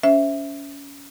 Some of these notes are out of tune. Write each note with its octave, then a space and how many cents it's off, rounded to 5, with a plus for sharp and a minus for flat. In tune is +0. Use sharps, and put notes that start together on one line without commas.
C#4 +25 C5 +0 E5 +0